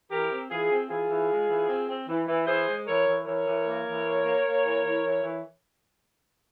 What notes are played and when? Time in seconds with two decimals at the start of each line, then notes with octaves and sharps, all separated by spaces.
0.10 E3 G4 A#4
0.30 C4
0.49 E3 F4 G#4
0.70 C4
0.89 E3 F4 G#4
1.09 E3
1.29 G#3
1.48 E3
1.68 C4
1.88 C4
2.08 E3
2.27 E3
2.47 E3 G#4 C5
2.67 G#3
2.86 E3 A#4 C#5
3.06 E3
3.25 E3 A#4 C#5
3.46 E3
3.66 A#3
3.85 E3
4.04 A#3
4.25 A#3
4.44 A#3
4.64 E3
4.84 E3
5.03 E3
5.23 E3